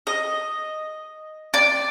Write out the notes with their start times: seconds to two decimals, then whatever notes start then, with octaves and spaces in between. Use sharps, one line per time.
0.07 D#5
1.54 D5